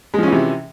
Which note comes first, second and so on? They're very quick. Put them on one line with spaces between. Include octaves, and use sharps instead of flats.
G#3 F3 C#4 E3 C3